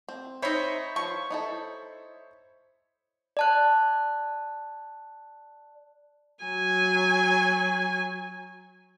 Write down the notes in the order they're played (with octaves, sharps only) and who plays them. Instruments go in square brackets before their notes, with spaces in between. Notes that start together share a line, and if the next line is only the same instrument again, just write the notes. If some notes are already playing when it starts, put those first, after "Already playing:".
[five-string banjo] C4
[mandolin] D#4 E5 [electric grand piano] C5 C#5 B5
[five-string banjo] F3 B4 [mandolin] C#6
[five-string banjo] D#4 E4 A4
[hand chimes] D5 A5 F#6
[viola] F#3 G#5